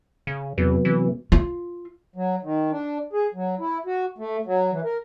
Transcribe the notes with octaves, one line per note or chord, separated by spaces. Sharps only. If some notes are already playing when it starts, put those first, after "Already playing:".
C#3
E2 C3 F#3 B3
E3
F4
F#3
D#3
D4
G#4
F#3
E4
F#4
A3
F#3
E3
A#4